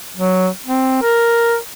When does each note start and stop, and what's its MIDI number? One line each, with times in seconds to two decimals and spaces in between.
0.17 0.48 54
0.66 0.98 60
1.02 1.56 70